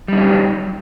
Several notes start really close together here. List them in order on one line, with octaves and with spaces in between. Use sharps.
G3 D#4 C#4 G4 F#3